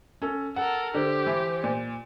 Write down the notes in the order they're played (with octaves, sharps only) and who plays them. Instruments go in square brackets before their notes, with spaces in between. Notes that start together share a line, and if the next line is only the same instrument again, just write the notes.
[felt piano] C#4 A4
[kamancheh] A4 A#4 [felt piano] F#5
[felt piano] D3 [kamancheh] G4 [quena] C5
[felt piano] E3
A#2